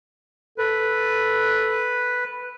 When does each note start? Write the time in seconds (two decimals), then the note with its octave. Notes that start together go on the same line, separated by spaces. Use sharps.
0.58 A4 B4